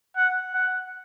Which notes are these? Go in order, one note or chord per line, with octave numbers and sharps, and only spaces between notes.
F#5
F#5